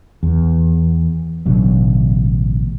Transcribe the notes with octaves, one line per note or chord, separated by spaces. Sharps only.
E2
A1 B2 D3 F#3